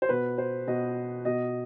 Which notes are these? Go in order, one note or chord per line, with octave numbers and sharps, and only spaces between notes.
C5
B2 B4
C5
B2 D#5
B2 D#5